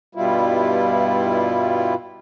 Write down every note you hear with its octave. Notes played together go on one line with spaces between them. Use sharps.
G2 B2 G3 E4 F4